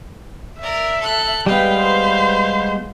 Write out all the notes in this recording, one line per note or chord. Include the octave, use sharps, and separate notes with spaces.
A#4 D5 E5
A4 F#6
G3 G#3 B3 B4 F5 G5
C5